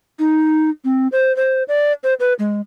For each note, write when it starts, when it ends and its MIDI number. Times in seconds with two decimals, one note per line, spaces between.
0.19 0.70 63
0.85 1.08 60
1.12 1.35 72
1.37 1.63 72
1.68 1.92 74
2.04 2.14 72
2.20 2.33 71
2.39 2.61 56